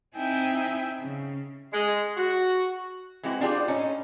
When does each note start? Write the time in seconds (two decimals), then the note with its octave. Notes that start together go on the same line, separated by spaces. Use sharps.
0.17 C4 D#4 E4 E5 G5 G#5
1.01 C#3
1.72 G#3
2.17 F#4
3.23 E3 G#3 C4 E4 F#4
3.41 D4 F4 G4 G#4 C5 D5
3.68 A2 C#4 D#4